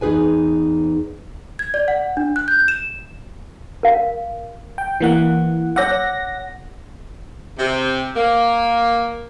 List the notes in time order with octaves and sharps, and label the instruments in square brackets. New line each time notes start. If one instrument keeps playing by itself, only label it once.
[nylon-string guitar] E2 D#4 G#4 B4 G#5
[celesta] G#6
D5
F#5
D4
F#6
G6
E7
[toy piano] A#4 F5
[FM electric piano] G5
E3 A#3 F#5
[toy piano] C#5 D6 E6 [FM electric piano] F#5 A#6
[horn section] C3
A#3